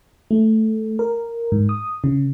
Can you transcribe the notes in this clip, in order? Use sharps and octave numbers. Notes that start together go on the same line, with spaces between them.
A3
A#4
G#2
D#6
C#3